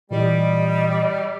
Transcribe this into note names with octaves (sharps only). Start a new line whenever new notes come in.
A#2 E3 G3 G4 D#5